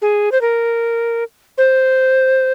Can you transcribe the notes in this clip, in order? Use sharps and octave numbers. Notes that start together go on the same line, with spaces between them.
G#4
C5
A#4
C5